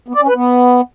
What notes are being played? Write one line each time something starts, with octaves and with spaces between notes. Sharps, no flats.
B3
D5
C#4
B4
B3